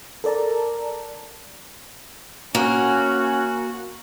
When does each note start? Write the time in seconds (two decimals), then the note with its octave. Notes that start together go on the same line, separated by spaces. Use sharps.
0.24 A4 A#4 D5 A5 A#5
2.55 A#3 C#4 F#4